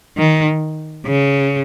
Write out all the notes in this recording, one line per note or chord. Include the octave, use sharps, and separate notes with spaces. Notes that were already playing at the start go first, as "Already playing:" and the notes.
D#3
C#3